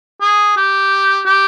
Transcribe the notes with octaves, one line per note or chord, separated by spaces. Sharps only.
G#4
G4
G4